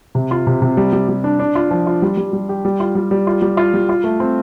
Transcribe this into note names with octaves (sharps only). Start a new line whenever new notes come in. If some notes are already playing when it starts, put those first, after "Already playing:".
C3
F4
C3
C3
G3
G3
G3
D4
D4
F4
F3
F4
G3
G3
G3
G4
G3
F4
G3
G3
F4
G3
F4
G3
F4
A3
C4